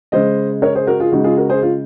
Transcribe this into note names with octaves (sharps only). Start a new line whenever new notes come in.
C#3 G#3 C5 D#5
A#4 C#5
G#4 C5
F#4 A#4
F4 G#4
C#3 G#3 D#4 F#4
F4 G#4
F#4 A#4
G#4 C5
F4